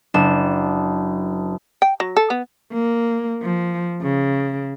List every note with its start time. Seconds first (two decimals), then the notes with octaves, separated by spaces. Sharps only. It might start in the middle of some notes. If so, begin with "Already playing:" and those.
0.14 F#1 D4 E7
1.82 G5
2.00 F#3
2.17 A4
2.30 B3
2.72 A#3
3.42 F3
4.02 C#3